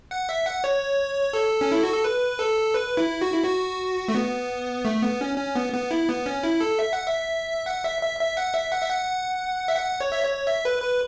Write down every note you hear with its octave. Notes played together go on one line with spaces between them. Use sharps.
F#5
E5
F#5
C#5
A4
C#4
E4
F#4
A4
B4
A4
B4
E4
F#4
E4
F#4
A3
B3
A3
B3
C#4
C#4
B3
B3
E4
B3
C#4
E4
A4
E5
F#5
E5
F#5
E5
E5
E5
F#5
E5
F#5
E5
F#5
E5
F#5
C#5
E5
C#5
E5
B4
B4